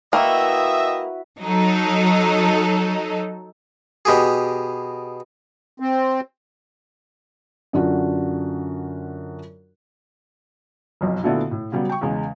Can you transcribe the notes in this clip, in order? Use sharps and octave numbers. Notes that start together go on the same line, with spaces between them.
A#3 E4 F#4 B4 D#5 E5 G5
F#3 D#4 A4
B2 G4 G#4
C4
F#2 D3 D4 F4 F#4
F#1 B1 F2
A#2 D3 A3 B3 E4 F#4
A2
C#3 F#3 G3 B3
G5 C#6
E2 C#3 G#3